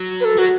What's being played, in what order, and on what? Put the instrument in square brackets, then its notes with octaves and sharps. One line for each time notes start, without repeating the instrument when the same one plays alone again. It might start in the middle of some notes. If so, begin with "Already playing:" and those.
Already playing: [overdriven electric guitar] F#3
[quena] B4
A4
[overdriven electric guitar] F#3 [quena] F#4